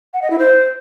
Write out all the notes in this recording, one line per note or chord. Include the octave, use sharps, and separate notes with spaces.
F#5
D#5
E4
C5